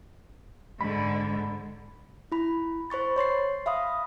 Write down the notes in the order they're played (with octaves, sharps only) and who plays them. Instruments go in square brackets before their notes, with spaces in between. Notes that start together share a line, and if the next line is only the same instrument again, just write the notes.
[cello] G#2 D3 [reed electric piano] B5
[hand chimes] E4 B5
C5 B5 C#6 A6
C#5 C6 A6 C7
E5 F5 B5 D#6